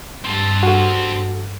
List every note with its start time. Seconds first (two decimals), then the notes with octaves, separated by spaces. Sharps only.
0.25 G2 C4 A5
0.63 F#4 A4